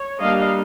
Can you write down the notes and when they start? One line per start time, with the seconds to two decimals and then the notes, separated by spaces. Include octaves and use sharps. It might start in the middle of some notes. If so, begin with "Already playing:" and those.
Already playing: C#5
0.20 G3 A#3 D4 D#5 F5